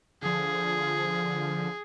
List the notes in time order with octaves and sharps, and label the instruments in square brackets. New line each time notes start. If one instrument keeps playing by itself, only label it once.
[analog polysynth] D3 F3 [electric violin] G#4